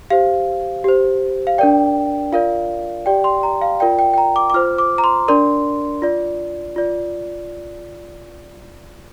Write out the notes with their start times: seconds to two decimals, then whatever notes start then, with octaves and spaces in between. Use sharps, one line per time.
0.10 G4 C5 F5
0.84 G4 C5
1.47 F5
1.58 D4 A#4 D5 G5
2.32 F4 A#4 D5 F5
3.06 G4 D5 G5
3.24 C6
3.43 A#5
3.61 F5
3.80 F4 A#4 D5 G5
3.99 G5
4.14 G5
4.18 A#5
4.36 D6
4.50 D6
4.54 F4 C5 F6
4.78 D6
4.98 A#5
5.04 C6
5.28 D4 A#4 D5 C6
6.02 F4 D5
6.76 F4 D5